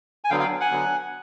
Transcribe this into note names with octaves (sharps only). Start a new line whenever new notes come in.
G#5
D3 F#3 B3 F5 G5
F5 G5
F#5 G#5
D3 F#3 B3